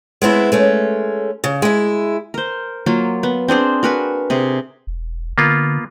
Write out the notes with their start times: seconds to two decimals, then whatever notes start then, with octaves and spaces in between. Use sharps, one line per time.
0.22 G#3 B3 C4 E4
0.52 G#3 A3 C#4
1.44 C#3
1.62 G#3 E4
2.34 A#4 C5
2.86 F#3 A#3 F4
3.23 B3
3.48 C4 D4 G#4 C5
3.83 F#4 A#4 B4 G#5
4.30 C3 G#4
4.87 E1
5.38 D3 A#3 B3 F4